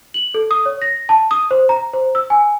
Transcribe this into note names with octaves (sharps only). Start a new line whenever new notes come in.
F#7
A4
D#6
C#5
A#6
A5
D#6
C5
A#5
C5
E6
G#5